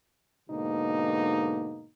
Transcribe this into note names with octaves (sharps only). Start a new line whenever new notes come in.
G#2 B2 D3 A#3 D#4